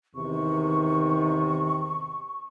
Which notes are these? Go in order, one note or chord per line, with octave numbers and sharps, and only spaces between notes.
E2 C3 D#3 C#6